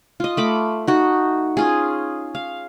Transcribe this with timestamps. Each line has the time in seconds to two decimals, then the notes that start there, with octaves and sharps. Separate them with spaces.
0.20 F4 D#5
0.37 A3 B5 D6
0.87 D#4 F#4
1.57 C#4 F4 G#4
2.35 F5